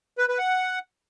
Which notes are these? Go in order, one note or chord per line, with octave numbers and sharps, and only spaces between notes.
B4
B4
F#5